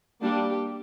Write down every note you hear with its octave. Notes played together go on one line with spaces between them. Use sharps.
G3 A#3 D4 G4